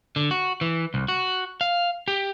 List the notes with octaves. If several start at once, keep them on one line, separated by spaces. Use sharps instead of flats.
D3
F#4
E3
C2
F#4
F5
G4